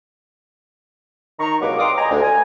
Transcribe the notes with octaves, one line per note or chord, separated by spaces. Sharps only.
D#3 A#5 C#6
C2 F#3 G#3 A#3 B4 D6
D#5 F5 G5 C6 D6 D#6
D#5 G5 G#5 A#5
D2
G#5